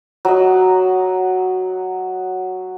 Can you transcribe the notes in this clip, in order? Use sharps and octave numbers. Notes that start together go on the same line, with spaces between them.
F#3 D#5